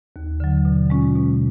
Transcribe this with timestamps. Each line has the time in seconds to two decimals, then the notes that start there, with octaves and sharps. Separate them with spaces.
0.16 D#2
0.40 D3 F#3
0.65 B2
0.90 G#3 C#4 F4
1.15 B2